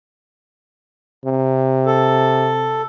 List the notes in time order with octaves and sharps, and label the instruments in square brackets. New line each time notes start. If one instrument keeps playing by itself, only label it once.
[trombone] C3
[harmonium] A4